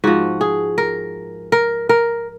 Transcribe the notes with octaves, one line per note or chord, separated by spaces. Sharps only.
G#2 F3 F#4
G#4
A#4
A#4
A#4